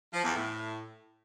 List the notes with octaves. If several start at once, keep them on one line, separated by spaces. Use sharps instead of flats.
F3
E2
A2